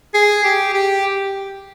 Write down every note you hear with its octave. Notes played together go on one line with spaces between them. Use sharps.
G#4
G4
G4